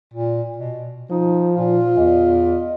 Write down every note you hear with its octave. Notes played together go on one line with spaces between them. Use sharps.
A#2
B2
F3 D#4
A#2 F4
E2 D#5